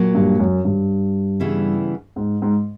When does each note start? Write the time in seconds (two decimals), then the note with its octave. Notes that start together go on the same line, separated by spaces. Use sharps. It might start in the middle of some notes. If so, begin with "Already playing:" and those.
Already playing: A#2 F#3 A#3
0.15 G2
0.39 F#2
0.65 G2
1.40 C#3 E3 G3 B3 E4
2.16 G#2
2.42 G#2